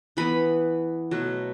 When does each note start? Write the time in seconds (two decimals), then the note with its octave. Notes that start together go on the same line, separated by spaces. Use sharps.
0.17 E3 B3 B5
1.11 B2 F#3 A3